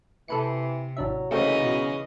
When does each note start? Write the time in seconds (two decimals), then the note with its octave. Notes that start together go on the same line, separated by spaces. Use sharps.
0.28 C3 E3 A4 B4 C#7
0.97 A1 F#3 D4 E5
1.31 C#3 E3 F#3 A3 A#3 C4 D#4 D#5
1.61 B2